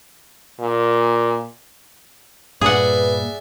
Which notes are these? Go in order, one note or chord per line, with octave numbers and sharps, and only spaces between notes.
A#2
G2 A#2 G#4 B4 D5 E5 F#5